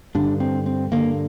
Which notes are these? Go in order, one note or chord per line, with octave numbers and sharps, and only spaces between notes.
G2 D3 D4
C4
C4
G2 D3 A#3